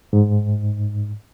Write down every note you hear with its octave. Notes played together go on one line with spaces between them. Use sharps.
G#2